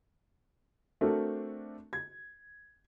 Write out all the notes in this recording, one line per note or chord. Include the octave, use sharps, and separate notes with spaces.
A3 C4 D4 F#4 A4 A#4
G#6